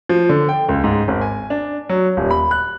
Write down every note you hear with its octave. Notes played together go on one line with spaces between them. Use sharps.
F3
D3
G5
C#2
G#2
G#1
G#5
D4
F#3
D#1
B5
F#6